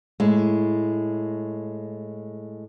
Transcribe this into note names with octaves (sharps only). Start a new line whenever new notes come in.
A2 G#3